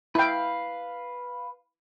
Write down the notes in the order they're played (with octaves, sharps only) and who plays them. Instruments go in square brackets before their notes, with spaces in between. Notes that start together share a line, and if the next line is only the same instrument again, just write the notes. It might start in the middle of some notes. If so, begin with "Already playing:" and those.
[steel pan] E4 G5 [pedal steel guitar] B4 F5